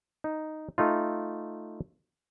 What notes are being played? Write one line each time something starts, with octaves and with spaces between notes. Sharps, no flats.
D#4
A3 D#4 F4